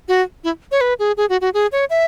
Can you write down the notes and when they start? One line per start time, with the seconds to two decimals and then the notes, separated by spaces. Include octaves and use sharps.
0.08 F#4
0.44 E4
0.72 C#5
0.81 B4
0.99 G#4
1.17 G#4
1.30 F#4
1.41 F#4
1.54 G#4
1.72 C#5
1.90 E5